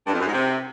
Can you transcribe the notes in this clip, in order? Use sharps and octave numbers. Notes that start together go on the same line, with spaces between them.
G2
F2
F#2
G#2
C3